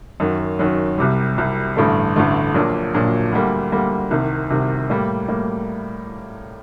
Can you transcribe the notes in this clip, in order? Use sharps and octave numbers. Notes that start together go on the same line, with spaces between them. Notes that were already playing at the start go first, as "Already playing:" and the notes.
F#2 D#3 F#3
F#2 D#3 F#3
C2 C3 G3
C2 C3 G3
A1 G2 D3 A3
A1 G2 D3 A3
A#1 A#2 F#3 A#3 D4
A#1 A#2 F#3 A#3 D4
D2 D3 G3 A#3
D2 D3 G3 A#3
C2 C3 D#3
C2 C3 D#3
A2 G3 A#3
A2 G3 A#3